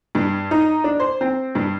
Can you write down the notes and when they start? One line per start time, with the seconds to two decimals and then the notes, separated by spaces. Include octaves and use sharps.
0.15 G2
0.51 D#4
0.84 D4
1.00 C5
1.21 C4
1.55 G2